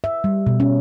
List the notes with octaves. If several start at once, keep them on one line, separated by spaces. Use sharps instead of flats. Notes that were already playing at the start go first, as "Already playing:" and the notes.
E5
G3
B2
C#4